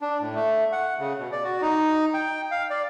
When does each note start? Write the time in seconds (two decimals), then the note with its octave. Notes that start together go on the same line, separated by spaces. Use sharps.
0.01 D4
0.21 A2
0.35 A3
0.72 F#5
0.99 C#3
1.20 B2
1.32 D5
1.44 F#4
1.62 D#4
2.14 G5
2.51 F5
2.70 D5